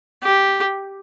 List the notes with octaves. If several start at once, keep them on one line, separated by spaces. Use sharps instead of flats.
G4